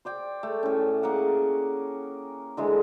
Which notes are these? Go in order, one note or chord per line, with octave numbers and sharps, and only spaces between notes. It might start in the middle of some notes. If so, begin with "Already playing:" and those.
C5 D5 G5
A3
A2 C#4
A#3 G#4 A#4 F#5
D3 E3 G#3